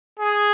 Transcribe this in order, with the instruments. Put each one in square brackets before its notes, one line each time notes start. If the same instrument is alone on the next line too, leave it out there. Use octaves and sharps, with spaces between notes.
[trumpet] G#4